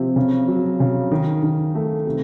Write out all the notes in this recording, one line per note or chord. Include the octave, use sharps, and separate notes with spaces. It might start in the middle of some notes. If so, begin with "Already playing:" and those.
Already playing: C3 F3
C#3
F#3
C#3
D#3
D#3
A3
C3